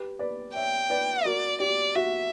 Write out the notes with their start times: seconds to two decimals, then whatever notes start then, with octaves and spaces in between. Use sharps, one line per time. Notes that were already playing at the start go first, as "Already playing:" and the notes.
Already playing: G4 B4
0.19 B4 D5
0.55 C#5 E5 G5
0.90 B4 D5
1.25 F#4 A#4 D5
1.60 G4 D5
1.95 F#4 E5